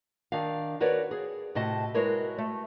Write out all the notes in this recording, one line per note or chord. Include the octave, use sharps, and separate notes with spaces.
D#3 D4 F5
F#4 A#4 B4 C#5 D5
G#4
A2 C3 F#4 D#5 A5
G#3 E4 F#4 A#4 B4 C#5
A3